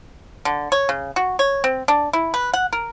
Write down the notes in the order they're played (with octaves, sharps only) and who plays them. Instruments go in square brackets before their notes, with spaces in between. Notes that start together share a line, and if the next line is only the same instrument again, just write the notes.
[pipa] D3
C#5
C#3
F#4
C#5
C4
D4
E4
B4
F#5
A#4